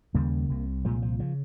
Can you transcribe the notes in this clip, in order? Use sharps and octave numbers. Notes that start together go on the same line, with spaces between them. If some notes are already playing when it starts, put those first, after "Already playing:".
D#2 C#3 G3 A#3
C2 C3
C2 A#2 F3 G#3
F3
C#3 F3